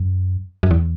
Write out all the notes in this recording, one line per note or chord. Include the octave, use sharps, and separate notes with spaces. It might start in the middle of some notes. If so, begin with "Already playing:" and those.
Already playing: F#2
F#2
E2